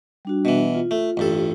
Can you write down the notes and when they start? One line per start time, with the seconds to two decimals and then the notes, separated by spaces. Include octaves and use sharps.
0.25 G3 D4 F#4
0.45 B2 E3
0.75 F4
0.91 A3
1.17 A1 G2 A4